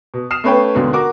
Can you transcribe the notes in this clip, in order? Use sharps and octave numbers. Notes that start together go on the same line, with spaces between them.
B2
D#6 F6 C7 E7
A3 C#4 B4 C#5 G5
D#2 G#2 B2 D3
F#4 A#4 D6